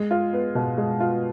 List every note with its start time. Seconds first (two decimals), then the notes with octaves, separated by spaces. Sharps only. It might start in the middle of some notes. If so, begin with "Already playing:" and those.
Already playing: G#3
0.11 F4
0.33 B3
0.55 B2
0.78 G#3
1.00 F4